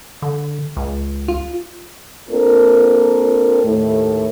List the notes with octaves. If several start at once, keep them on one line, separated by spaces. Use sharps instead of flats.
D3
C#2
F4
A#3 C4 D4 F4 A4 A#4
D#2 A2 A3